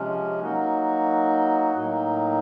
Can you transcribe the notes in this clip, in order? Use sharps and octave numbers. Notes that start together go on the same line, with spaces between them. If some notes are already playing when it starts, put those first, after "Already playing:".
Already playing: C3 F3 G#3 C#4
F#3 A#3 D#4 F#4
A2 F#3 A#3 D#4